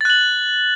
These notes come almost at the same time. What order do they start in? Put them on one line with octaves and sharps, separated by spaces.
A6 F#6 F#7